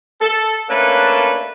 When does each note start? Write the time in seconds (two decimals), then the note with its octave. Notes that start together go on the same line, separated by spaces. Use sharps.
0.21 A4
0.70 A3 A#3 C#4 D4 A4 B4